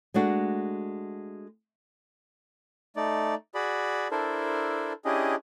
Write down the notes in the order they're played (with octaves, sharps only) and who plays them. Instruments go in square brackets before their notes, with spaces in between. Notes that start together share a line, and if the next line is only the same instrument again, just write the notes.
[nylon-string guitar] G#3 A3 D4 F#4
[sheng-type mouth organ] A3 D#4 D5
F#4 G#4 D5 B5
D4 E4 A4 A#4 C5
C#4 D4 E4 G4 G#4 D#5